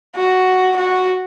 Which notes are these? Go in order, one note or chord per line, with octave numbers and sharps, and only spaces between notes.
F#4
F#4